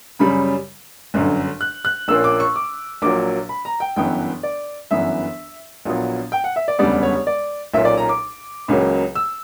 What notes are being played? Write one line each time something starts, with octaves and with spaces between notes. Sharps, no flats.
F#2 C#3 G3 C#4 B5
G1 F#2 D3
F#6
F#6
A#1 A#2 A#3 C#4 E6
D6
C#6
D6
A#1 A#2 F#3 A#3 D6
B5
A#5
G5
G1 F#2 E3 B3 G5
D5
G1 F#2 E3 B3 E5
A#1 A#2 F#3 B3
G5
F#5
E5
D5
E1 D2 C#3 G3 B3 D5
C#5
D5
B1 A#2 A#3 C#4 E5
D5
A#5
D6
C#2 C#3 F#3 A#3
E6